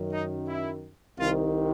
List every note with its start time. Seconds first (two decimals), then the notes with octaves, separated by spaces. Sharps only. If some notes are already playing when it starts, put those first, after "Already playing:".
Already playing: F#2 D#3
0.10 D#4
0.47 E4
1.17 C2 C3 D#3 F4